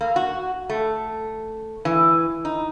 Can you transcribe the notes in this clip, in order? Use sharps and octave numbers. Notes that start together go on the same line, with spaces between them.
A#3
F#4
A3
E3
D#4